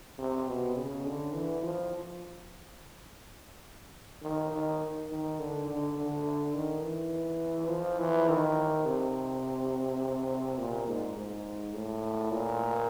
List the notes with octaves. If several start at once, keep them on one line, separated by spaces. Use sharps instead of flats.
C3
B2
C#3
D3
E3
F3
D#3
D#3
D#3
D3
D3
D3
D#3
E3
F3
E3
D#3
C3
A#2
G#2
G#2
A2
A#2